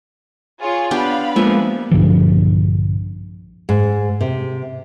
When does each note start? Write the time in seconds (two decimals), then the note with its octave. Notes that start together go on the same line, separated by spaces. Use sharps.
0.59 F4 G#4 C#5
0.91 B3 D4 G4 F5 B5
1.36 F3 G#3 A#3 B3 E5
1.91 A#1 G2 D3 F3
3.69 G#2
4.21 C3